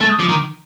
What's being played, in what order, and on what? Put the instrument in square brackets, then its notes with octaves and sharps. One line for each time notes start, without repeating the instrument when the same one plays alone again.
[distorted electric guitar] A3 [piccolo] A6
[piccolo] D#6
[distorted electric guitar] F3 [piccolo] D6
[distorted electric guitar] D#3